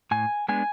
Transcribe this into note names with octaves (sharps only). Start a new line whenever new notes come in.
A2 G#5
G#3 B3 D4 G#5